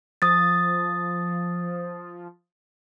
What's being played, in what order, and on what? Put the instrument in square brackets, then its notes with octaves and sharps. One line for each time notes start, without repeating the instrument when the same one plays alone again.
[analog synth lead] F3 [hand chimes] D#6 A6